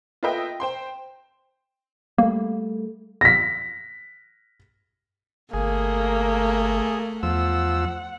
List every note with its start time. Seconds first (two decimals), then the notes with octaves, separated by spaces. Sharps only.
0.23 F4 A4 B4 D#5 E5 G5
0.60 C5 G5 C6
2.18 G3 A3 A#3
3.21 A#6 B6
5.53 G1 A3 A#3 G#4
7.23 E2 F3 F#5 E6